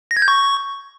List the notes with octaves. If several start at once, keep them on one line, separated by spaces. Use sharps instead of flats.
A#6
G#6
G6
C#6